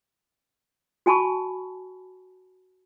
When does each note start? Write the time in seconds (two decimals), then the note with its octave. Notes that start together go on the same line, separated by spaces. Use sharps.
1.06 F#4 G#5 A5 B5 C#6